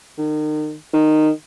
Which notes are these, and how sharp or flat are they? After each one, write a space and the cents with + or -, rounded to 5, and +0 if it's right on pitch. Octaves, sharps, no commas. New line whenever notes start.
D#3 -35
D#3 -15